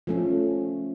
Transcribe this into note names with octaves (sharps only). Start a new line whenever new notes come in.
F3 A3 C#4